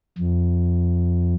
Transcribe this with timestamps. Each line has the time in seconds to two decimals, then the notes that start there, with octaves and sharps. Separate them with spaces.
0.18 F2